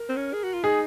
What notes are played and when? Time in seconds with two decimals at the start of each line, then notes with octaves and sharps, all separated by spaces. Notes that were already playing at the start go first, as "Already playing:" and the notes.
Already playing: A#4
0.09 C4
0.17 C#4
0.33 G#4
0.44 F#4
0.53 F4
0.63 D#4 G#4